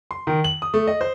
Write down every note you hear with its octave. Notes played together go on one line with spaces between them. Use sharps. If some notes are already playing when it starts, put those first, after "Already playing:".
C6
D#3
F#7
D#6
A3
D#5
C5